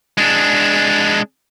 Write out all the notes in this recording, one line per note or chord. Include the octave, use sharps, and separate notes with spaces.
G#3 D4